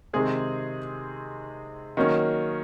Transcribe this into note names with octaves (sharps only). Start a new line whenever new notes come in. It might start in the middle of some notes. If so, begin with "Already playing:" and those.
C3 D#3 G#3 C4 G#4
D#3 F#3 A#3 C#4